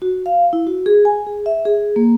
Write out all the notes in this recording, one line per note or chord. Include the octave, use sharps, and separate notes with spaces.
F#4
F5
E4
F#4
G#4
G#5
G#4
E5
G#4
A#3